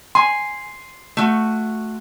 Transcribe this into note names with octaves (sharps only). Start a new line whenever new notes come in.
G#5 C6
A3 F#4